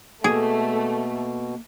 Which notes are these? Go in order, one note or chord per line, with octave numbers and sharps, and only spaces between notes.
B2 A3 A#3 G#4